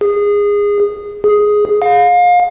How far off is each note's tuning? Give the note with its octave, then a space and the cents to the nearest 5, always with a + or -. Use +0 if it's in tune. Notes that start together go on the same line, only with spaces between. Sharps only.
G#4 -20
G#4 +5
F5 +30